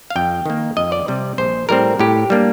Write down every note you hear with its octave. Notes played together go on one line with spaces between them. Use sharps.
F5
F2 G5
D#3 A#3
F2 D#5
D5
C3 G3
A#1 C5
A2 G3 C4 A#4
A2 G4
G3 A#3 D4